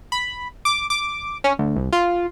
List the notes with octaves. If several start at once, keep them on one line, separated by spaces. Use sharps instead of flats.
B5
D6
D6
C#4
D2
C2
F4